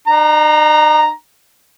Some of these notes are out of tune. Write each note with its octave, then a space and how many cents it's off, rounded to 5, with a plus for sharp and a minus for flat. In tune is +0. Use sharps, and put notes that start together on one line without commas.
D#4 -45 A#5 +0